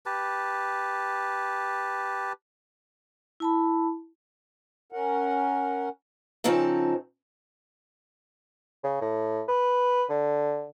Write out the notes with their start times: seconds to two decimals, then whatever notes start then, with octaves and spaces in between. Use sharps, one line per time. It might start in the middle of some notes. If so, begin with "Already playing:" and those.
0.06 G4 B4 A5
3.40 E4 A5 B5
4.92 C#4 A#4 F#5
6.44 C#3 F3 C4 D#4 A4
8.84 C#3
9.01 A2
9.48 B4
10.10 D3